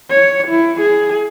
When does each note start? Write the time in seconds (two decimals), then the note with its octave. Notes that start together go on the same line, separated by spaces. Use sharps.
0.11 C#5
0.48 E4
0.81 G#4